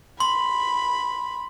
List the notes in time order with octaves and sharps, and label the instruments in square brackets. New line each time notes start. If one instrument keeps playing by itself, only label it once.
[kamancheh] B5 [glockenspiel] C6